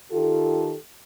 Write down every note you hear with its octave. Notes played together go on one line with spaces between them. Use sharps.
D#3 F4 G4 A4